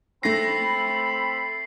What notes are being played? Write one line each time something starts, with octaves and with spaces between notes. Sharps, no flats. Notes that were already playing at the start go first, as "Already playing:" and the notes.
A3 C4 A4 B5 A#6 C7